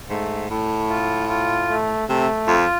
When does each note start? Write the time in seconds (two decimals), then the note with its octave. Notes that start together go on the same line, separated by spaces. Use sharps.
0.10 G#2 A3
0.50 A2 A3
0.90 F4
1.28 F4
1.68 A3
2.09 C3 A3
2.47 F2 F4